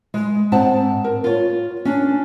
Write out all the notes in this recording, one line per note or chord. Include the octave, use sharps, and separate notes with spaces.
G#3
G#2 C4 F#5 A5
A#4
F4 C#5
C#4 D4